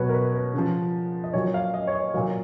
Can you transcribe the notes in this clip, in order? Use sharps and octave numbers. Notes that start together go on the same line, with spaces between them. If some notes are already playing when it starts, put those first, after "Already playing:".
Already playing: B2 F#3 B4 C#5
A#4
B4
B4
C#3 F3
D#5
A#2 F#3 C#5
F5
D#5
C#5
D#5
A#2 F#3 F5